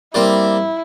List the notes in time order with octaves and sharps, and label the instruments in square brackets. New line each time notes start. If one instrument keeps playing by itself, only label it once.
[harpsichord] G3 A#3 C4 [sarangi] E4